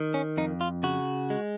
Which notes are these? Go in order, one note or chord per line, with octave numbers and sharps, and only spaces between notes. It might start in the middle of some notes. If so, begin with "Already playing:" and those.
Already playing: D#3
C#4
F2 D#4
F4
C#3 F#4
G#3